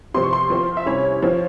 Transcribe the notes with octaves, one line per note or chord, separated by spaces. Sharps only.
C3 F3 C4 C6
C#6
C6
F3 C4 F4
E5
C3 G3 C#4 E4 C#5
F3 C4 F4